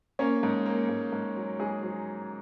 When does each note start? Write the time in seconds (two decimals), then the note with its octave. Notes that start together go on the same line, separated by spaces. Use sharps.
0.19 A#3 C#4 C#5
0.43 G#2
0.66 A#3
0.89 G#2
1.12 G#2
1.36 F#3
1.60 G#2 G#4 G#5
1.83 F#3